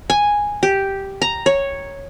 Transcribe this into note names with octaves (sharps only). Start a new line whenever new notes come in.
G#5
G4
A#5
C#5